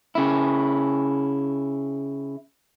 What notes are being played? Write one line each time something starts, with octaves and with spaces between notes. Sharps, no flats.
C#3 E4